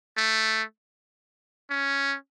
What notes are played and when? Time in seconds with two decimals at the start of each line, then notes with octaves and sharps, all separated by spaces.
0.17 A3
1.70 C#4